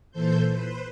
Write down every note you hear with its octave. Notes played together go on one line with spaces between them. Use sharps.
A#2 E3 A4 C5 G6
B4 C5